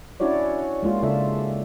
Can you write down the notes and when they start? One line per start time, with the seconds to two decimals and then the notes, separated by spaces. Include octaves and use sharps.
0.20 C#4 D4 E4 F#4 C#5 D5
0.83 G#3 A#3 F4
1.03 C#3 D4 F4 A4 E5